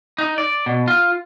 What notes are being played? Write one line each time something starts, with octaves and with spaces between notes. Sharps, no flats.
D#4
D5
B2
F4